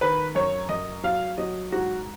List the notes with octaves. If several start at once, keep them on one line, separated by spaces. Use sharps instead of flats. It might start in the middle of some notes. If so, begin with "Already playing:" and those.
D#3 B4
F#2 C#5
F#2 D#5
F#3 F5
F#3 D#5
G#2 F#4